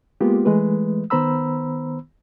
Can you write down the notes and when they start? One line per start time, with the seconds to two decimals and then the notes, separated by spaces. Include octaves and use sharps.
0.21 G#3 A#3 B3 F4 G4
0.45 E3 G#3 A3 B4
1.10 D#3 B3 C5 A#5 B5 E6